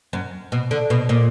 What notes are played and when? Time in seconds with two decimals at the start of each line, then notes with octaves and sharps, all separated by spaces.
0.13 F#2
0.52 B2
0.71 D3
0.90 B2
1.09 A#2